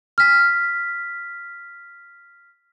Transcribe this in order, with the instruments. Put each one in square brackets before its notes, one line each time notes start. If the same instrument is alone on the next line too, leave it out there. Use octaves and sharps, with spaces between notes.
[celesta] F6 B6